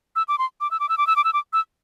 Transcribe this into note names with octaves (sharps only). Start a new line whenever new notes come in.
E6
D6
C6
D6
E6
D6
E6
D6
E6
D6
E6
D6
E6